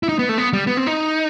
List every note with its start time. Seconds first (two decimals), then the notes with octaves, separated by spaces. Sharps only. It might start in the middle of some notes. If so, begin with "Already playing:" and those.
0.03 E4
0.09 D#4
0.19 B3
0.29 A3
0.38 B3
0.53 G3
0.67 B3
0.77 C4
0.87 D#4